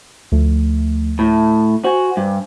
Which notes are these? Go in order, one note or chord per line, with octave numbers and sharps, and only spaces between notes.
D2 F3 A3
A2 A5
F#4 C5 G#5
G2